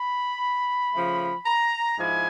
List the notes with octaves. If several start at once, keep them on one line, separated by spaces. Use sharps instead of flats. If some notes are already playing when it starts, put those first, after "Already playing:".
Already playing: B5
C#3 F3 A3
A#5
G#2 F3 E4 G#5